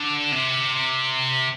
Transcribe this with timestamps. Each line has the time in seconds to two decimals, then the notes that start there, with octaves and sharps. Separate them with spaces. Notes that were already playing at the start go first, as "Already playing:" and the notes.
Already playing: D3
0.32 C3